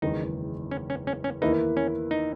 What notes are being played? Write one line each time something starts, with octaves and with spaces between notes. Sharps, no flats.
F#1 E2 D#3 G#3 D#4
C#4
C#4
C#4
C#4
E2 D#3 A#3 D#4 E4 B4
C#4
D#4